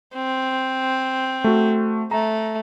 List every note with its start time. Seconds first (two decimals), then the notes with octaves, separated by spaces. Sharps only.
0.15 C4
1.44 A3 F#4
2.11 A3 A#5